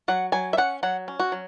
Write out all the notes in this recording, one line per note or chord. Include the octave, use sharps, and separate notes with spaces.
F#3 F#5
F#3 G#5
E5
C#4 F#5
F#3 F#5
C#4
F#4
F#3